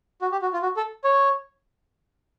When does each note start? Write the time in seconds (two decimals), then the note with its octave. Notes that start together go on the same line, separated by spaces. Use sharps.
0.21 F#4
0.32 G4
0.42 F#4
0.53 F4
0.62 F#4
0.77 A4
1.04 C#5